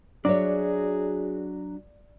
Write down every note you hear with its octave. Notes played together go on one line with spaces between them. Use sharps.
F#3 D4 F#4 G#4 C#5 D5 E5